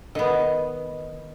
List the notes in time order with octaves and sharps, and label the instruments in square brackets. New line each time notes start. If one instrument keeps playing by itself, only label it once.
[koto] D#3 B3 [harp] D#5